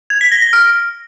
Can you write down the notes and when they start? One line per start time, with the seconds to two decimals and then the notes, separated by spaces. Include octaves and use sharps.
0.10 G#6
0.21 B6
0.32 A#6
0.42 A#6
0.53 F6